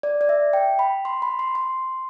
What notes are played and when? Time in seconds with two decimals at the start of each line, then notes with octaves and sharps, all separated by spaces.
0.03 D5
0.21 D5
0.29 E5
0.53 G5
0.79 B5
1.05 C6
1.22 B5
1.39 C6
1.55 C6